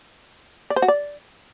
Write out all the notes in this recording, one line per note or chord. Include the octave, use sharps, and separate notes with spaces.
D5
C5
F#4
D5